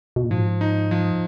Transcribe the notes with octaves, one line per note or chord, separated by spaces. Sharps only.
B2
A#2
G#2 F3
D#4
F3